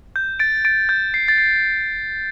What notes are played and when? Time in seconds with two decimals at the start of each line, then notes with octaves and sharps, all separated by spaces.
0.16 G6
0.39 A6 D7
0.65 A6 D7
0.89 G6
1.14 C7
1.28 A6
1.38 C7